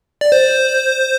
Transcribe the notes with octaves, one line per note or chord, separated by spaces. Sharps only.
D5
C5